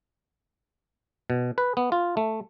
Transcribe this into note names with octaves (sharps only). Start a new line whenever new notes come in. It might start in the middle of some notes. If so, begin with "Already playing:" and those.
B2
B4
B3
F4
A3